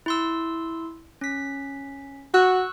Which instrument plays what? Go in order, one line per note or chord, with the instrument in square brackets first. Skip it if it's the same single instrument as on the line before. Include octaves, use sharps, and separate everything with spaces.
[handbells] E4 C6 E6
C#4 B6
[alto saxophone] F#4 [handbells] C#6 E6 F#6